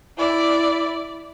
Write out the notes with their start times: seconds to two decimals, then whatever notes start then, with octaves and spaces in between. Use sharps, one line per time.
0.18 E4 D5